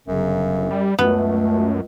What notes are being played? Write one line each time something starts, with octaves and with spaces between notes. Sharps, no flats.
G1 F#2 C#3 F#3
G3
C#2 F#2 A3 B3